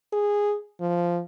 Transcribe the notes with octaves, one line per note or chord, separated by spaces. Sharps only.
G#4
F3